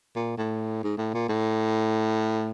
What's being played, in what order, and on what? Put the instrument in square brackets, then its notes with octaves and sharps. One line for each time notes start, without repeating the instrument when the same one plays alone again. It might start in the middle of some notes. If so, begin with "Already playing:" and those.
[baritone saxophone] A#2
A2
G#2
A2
A#2
A2